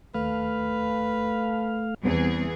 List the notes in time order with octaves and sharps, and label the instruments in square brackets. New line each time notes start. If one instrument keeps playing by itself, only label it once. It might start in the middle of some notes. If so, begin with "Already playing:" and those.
[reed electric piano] D#2 [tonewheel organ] A3 F5 [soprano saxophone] B4
[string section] E2 G#4 [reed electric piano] G3 B3 C4